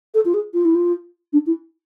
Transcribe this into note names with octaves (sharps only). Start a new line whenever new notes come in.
A4
F4
G#4
F4
E4
F4
D4
E4